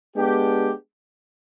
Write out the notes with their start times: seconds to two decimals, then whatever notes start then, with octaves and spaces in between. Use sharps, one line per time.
0.15 G#3 B3 D4 G4